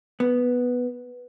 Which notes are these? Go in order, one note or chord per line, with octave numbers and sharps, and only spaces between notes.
B3